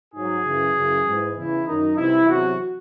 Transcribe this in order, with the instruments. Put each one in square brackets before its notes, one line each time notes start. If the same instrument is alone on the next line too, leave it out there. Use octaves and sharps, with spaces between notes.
[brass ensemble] G#2 F#3 G#4
F#2 C#3 E3
F#2 C#3 E3
G#2 E3
E2 C#3 E3 E4
F#2 D#3 F#3 D#4
C2 C3 E3 E4
E2 C3 F#3 F#4